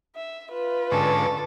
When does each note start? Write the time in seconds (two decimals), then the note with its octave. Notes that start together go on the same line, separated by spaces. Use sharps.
0.16 E5
0.53 F4 B4
0.92 G#2 D3 C#4 A4